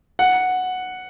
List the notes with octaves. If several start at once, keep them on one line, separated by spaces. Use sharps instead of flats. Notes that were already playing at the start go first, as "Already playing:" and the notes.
F#5